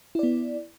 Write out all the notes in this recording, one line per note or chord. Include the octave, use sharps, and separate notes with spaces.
B3 E4 D5